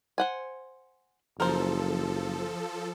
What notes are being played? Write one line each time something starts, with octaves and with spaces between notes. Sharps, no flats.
C5 F#5 G#5
F#1 F3 A4 A#4 C5